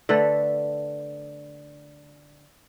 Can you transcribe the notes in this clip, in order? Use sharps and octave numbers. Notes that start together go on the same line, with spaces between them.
D3 A3 A4 B4